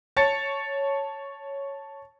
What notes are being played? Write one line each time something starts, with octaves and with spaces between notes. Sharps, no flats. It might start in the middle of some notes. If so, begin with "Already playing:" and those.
C#5 A5 A6 C#7